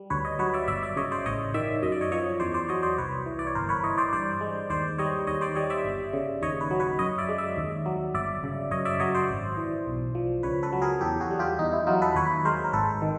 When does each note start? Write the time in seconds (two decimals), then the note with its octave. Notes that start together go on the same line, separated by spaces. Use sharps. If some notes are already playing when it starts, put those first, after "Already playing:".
Already playing: G3
0.10 D2 B4 C#5
0.25 C#5 D#5
0.39 F#3 B4 C#5
0.54 D5 E5
0.68 G1 D5 E5
0.83 D5 E5
0.96 C#3 C#5 D#5
1.12 C5 D5
1.26 A1 C#5 D#5
1.54 D#3 D5 E5
1.82 F#2 D#5
1.92 D5
2.01 C#5 D#5
2.12 F3 C#5 D#5
2.40 E2 C5 D5
2.54 C5 D5
2.69 F#3 C#5 D#5
2.83 C5 D5
2.98 C2 B4 C#5
3.26 E3
3.39 D5
3.47 C#5
3.55 G1 A#4 C5
3.69 B4 C#5
3.83 E3 C#5 D#5
3.98 C5 D5
4.13 G2 C5 D5
4.41 G#3
4.70 D#2 C5 D5
4.98 G3 C#5 D#5
5.27 D#2 C#5 D#5
5.41 C5 D5
5.55 G3 C#5 D#5
5.70 D5 E5
5.85 G1
6.13 C#3
6.41 D#2 C#5 D#5
6.61 B4 C#5
6.71 F#3
6.80 B4 C#5
6.99 F#2 C#5 D#5
7.18 D5 E5
7.29 G#3
7.38 D5 E5
7.57 D#2
7.86 F#3
8.14 G1 D5 E5
8.44 C#3
8.71 F#2 C#5 D#5
8.85 D5 E5
9.00 F#3 C#5 D#5
9.15 C5 D5
9.29 G#1
9.57 E3
9.87 B1
10.15 F3
10.43 C#2 B4 C#5
10.63 A4 B4
10.72 F#3
10.81 G#4 A#4
11.01 E2 G4 A4
11.20 F#4 G#4
11.30 G3
11.39 F4 G4
11.59 E2 D#4
11.73 E4
11.87 F#3 D#4 F4
12.02 A4 B4
12.15 D#2 B4 C#5
12.45 G#3 A#4 C5
12.64 A#4
12.73 G#1 A4 B4
13.02 D#3